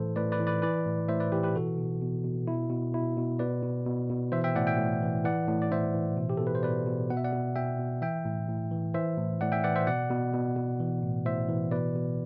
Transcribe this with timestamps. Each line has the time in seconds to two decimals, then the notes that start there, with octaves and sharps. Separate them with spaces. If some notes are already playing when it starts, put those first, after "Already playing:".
Already playing: A2 E3 A4 C5
0.16 A2 B4 D5
0.32 B4 D5
0.40 E3
0.47 B4 D5
0.62 E3 B4 D5
0.86 A2
1.08 A2 C5 E5
1.20 B4 D5
1.32 E3 G4 B4
1.43 G4 B4
1.55 B2 F#4 A4
1.78 B2
2.01 B2
2.24 B2
2.47 B2 E4
2.70 B2
2.94 B2 E4
3.17 B2
3.39 B2 B4 D5
3.63 B2
3.86 B2
4.09 B2
4.32 E3 C5 E5
4.44 E5 G5
4.55 A2 D5 F#5
4.67 E5 G5
4.78 A2
5.02 E3
5.24 E3 D5 F#5
5.47 A2
5.62 D5
5.72 A2 C5 E5
5.94 E3
6.17 B2
6.30 G4
6.37 B2 A4
6.47 B4
6.55 C5
6.63 B2 B4 D5
6.86 B2
7.10 B2 F#5
7.17 E5
7.24 D5 F#5
7.33 B2
7.55 B2 E5 G5
7.79 B2
8.02 E3 E5 G5
8.25 A2
8.49 A2
8.71 E3
8.94 E3 C5 E5
9.18 A2
9.41 A2 D5 F#5
9.52 E5 G5
9.64 E3 D5 F#5
9.76 C5 E5
9.87 B2 D5 F#5
10.10 B2
10.34 B2
10.56 B2
10.80 E3
11.03 A2
11.26 A2 C5 E5
11.49 E3
11.71 B2 B4 D5
11.96 B2